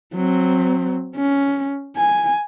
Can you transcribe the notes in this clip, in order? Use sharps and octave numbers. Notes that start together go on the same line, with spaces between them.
F#3 C4
C#4
G#5